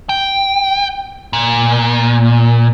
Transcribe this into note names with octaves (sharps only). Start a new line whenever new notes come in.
G5
A#2